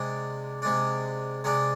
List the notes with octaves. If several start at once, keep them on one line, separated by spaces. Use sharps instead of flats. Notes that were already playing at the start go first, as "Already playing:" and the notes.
Already playing: C3 G#3 D4
C3 G#3 D4
C3 G#3 D4